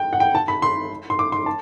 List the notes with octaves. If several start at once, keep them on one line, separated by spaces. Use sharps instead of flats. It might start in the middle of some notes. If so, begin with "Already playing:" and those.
Already playing: G5
F#5
G5
A5
B5
C6
C6
D6
C6
A5